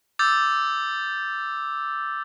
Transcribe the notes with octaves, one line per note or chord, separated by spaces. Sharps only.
D6 E6 G6 A6